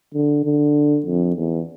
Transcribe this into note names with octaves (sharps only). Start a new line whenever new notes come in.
D3
D3
F2
E2